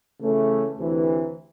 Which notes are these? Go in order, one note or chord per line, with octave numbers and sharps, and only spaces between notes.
C#3 E3 A3 C#4
D2 C3 E3